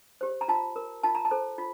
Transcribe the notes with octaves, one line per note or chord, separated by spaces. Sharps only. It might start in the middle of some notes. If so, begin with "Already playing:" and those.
G4 C5
A#5
F4 A5
A#4
F4 A5
A#5
A5
A4 C5
F4